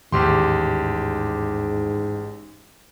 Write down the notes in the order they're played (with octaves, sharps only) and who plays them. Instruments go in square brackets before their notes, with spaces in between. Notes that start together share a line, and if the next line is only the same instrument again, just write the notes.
[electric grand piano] A1 G4 C6 [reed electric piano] D#2 [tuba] G#2